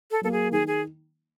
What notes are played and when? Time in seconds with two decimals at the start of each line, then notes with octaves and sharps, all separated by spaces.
0.11 A4
0.21 F#3 A#3 A4
0.32 G#4
0.52 D#3 G#4
0.67 G#4